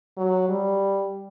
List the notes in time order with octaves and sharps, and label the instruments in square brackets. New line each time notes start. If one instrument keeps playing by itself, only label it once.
[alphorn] F#3
G3